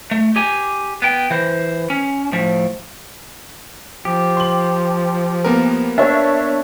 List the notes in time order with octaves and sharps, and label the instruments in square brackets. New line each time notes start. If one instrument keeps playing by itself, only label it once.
[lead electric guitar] A3
G4 G#5
B3 G5
E3 C5
C#4
A2 F3
[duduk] F3 [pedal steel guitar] G4
[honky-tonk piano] C6 F#7
[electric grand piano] A#3 B3 A#4
[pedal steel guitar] D4 [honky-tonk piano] C#5 E5